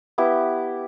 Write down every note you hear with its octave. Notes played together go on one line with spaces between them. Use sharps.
B3 E4 G4